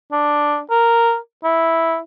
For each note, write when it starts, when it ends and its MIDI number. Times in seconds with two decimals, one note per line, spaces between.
0.12 0.60 62
0.71 1.16 70
1.44 1.98 64